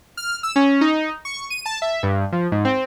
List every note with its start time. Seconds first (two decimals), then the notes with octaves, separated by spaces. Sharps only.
0.17 F6
0.43 E6
0.56 C#4
0.81 D#4
1.25 C#6
1.50 D#7
1.66 A5
1.82 E5
2.03 G2
2.32 F3
2.52 G#2
2.65 C4